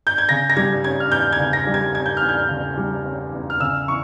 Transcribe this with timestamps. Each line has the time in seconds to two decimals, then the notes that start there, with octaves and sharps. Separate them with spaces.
0.07 G6
0.18 G#6
0.29 C#3 A#6
0.50 A#6
0.57 G3 G#6
0.84 C#4 G#6
1.00 F6
1.11 E2 G6
1.33 G#6
1.39 C#3
1.53 A#6
1.67 G3
1.74 G#6
1.95 C#4 G#6
2.06 G6
2.17 F6
2.22 E2
2.29 G6
2.49 C#3
2.77 G3
3.05 C#4
3.33 E2
3.50 F6
3.60 C#3 E6
3.88 E3 C#6